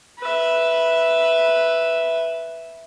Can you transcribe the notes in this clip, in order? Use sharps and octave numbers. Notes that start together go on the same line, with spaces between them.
B4 E5